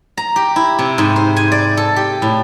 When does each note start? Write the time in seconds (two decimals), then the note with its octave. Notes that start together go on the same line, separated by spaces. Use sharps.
0.17 A#5
0.36 G4
0.56 E4
0.79 C3
0.98 G#2
1.16 C5
1.36 G#5
1.52 D5
1.77 A4
1.96 G4
2.22 A2